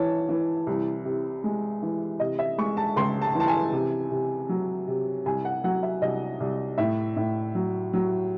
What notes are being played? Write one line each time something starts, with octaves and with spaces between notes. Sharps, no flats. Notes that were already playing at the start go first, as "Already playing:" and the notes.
Already playing: E3 C#5 A5
E3
C2
C3
G#3
E3
C3 D#5
E5
G#3 C#6
A5
C#2 C6
A5
E3 A5
G#5
C3
C3
F#3
C3
C2 G#5
F#5
F#3 F#5
E5
C2 D#5
C2
A2 E5
A2
F#3
F#3